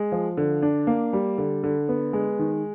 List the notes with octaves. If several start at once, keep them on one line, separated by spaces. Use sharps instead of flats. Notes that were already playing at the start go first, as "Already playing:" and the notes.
Already playing: G#3
F3
D3
D4
A#3
G3
D3
D3
B3
G#3
D#3